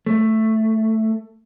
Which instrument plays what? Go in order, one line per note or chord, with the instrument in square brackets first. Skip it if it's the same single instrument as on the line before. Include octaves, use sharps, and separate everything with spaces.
[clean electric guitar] A3